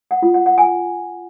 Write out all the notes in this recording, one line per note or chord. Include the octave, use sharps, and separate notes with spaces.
F#5
F4
F#5
F#5
G#5